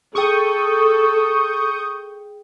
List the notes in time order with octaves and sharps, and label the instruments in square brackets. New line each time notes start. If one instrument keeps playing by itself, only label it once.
[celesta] G#4 G5 [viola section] A4 [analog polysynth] C#6 D#6 G6